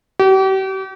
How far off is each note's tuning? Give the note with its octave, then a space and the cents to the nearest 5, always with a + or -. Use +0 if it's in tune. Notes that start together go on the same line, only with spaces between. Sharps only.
G4 -40